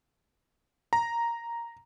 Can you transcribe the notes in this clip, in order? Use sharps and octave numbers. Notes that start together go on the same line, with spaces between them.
A#5